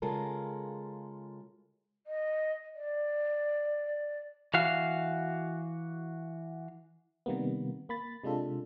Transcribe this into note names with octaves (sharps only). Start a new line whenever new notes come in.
C#3 G#3 F4 A4 A#4
D#5
D5
E3 F#4 F5
C3 D#3 G3 A#3 B3
A#3 B5 A6
C3 G#3 D4 F4 A4